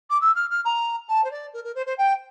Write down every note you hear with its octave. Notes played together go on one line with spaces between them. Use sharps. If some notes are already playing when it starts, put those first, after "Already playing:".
D6
E6
F6
F6
A#5
A5
C5
D5
A#4
A#4
C5
C5
G5